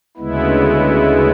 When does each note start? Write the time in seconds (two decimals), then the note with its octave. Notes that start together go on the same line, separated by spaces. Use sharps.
0.17 D2 C#3 G#3 B3 E4